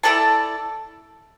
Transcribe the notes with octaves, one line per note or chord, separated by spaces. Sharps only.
E4 A4 D5 A5